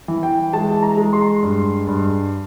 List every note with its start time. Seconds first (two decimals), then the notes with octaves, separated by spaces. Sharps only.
0.08 E3
0.23 G5
0.53 G#3 A5
0.83 A#5
0.97 G#3
1.13 C6
1.43 G2
1.87 G2